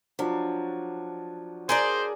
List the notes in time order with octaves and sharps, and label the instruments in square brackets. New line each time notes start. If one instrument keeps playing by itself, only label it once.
[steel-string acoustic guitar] F3 [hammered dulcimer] F#3 D4
[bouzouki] G#4 A#4 D5 [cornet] C5